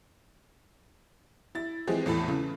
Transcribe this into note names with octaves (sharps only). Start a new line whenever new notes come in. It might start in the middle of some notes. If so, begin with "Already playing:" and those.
E4 A6
E3 F3 G#3 C4 G4 G#4
E2 A2 A4 B5
C#3 E3